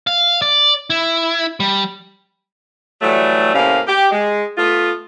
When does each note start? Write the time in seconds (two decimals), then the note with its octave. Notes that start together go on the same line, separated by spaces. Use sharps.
0.07 F5
0.42 D5
0.90 E4
1.60 G3
3.02 E3 F#3 G3 A3
3.54 A2 C3 A#3 C#4 F5
3.87 G4
4.11 G#3
4.57 A3 B3 F4